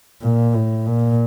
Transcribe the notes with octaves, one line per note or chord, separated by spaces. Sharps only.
A#2
A2
A#2